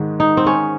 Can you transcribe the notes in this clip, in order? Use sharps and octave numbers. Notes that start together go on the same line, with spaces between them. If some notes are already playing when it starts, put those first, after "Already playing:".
Already playing: G#2 D#3 G#3
D#4
C4
C#4